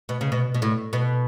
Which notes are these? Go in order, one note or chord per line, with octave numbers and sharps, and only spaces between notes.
B2
C#3
B2
B2
A2
B2